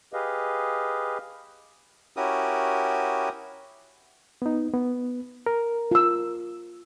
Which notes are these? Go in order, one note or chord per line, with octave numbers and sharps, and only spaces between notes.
G4 G#4 B4 D#5 F5
C#4 E4 F#4 G4 A#4 D#6
B3 D#4
B3
A#4
F4 E6